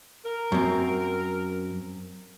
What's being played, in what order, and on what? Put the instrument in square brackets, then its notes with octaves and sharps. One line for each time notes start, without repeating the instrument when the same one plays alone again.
[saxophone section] A#4
[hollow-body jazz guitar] F#2 C4